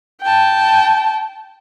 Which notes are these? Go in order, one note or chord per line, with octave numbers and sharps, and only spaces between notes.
G5 A5